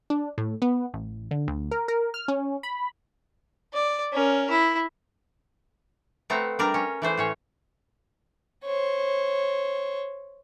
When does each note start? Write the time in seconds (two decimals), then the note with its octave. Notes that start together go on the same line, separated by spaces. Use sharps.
0.10 D4
0.38 A2
0.62 B3
0.94 A1
1.31 D3
1.48 D2
1.71 A#4
1.88 A#4
2.14 F6
2.28 C#4
2.63 B5
3.74 D5
4.12 C#4 A#4
4.50 E4
6.30 A3 B3 C4 A#5
6.59 G3 D4 A#4
6.74 C#4
7.02 E3 A3 C5
7.17 A2 C#4 C#5
8.65 C5 C#5